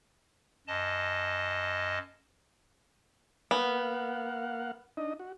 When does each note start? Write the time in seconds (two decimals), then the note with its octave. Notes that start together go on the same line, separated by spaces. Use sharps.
0.67 F#2 D#5 A5
3.51 A#3 B3 F5 F#5
4.97 D4 D#4 D#5
5.19 F#4